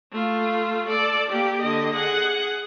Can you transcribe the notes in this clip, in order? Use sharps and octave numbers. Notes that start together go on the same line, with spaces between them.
A3 F4
A4 D5
A#3 G4
D3 D#5
G#4 F#5